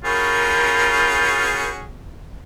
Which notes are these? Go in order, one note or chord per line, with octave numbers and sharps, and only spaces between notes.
C#4 F4 F#4 G#4 A#4 B5 G6